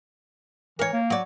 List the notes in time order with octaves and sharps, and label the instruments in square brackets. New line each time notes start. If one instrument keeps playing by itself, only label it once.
[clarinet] E3 [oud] A#4 C#5
[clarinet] A#3
[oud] F#3 D5